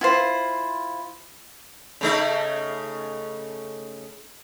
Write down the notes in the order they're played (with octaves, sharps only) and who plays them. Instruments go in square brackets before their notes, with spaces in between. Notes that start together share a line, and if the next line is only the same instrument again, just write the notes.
[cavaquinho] E4 F4 C5
[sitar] C#3 A3 D#4